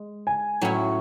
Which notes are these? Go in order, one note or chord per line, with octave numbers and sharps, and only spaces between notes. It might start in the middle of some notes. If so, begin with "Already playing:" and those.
Already playing: G#3
G#5
A2 F#3 C#4 E4